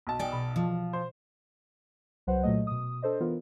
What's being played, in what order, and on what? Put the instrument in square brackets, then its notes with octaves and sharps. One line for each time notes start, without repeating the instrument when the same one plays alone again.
[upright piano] B1 A5
[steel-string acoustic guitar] D#4 D5 [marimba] G5 G#5
[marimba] B2 B5
[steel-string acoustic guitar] F3
[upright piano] C5
[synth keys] C2 F#3 B4 C5 F#5
A#2 F#3 A3 D#5
B2 D#6
D4 A4 C5 D#5
E3 B3 F4 A#4